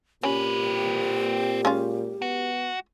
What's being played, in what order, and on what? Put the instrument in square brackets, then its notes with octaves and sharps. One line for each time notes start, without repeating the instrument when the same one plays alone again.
[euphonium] A#2 [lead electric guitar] C4 B4 [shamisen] C#4 [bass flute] G4
[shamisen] G#3 C#4 F4
[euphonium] B3 [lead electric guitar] F#4